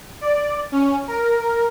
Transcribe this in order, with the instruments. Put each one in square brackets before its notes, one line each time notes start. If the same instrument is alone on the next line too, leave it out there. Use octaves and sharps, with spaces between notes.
[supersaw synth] D5
C#4
A#4